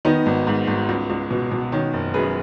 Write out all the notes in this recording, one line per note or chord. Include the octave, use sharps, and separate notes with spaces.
D#3 B3 D#4
G#1
G#2
G#1
C#2
C#2
B2
B2
D#3 C#4
F#1
F#2 G#4 B4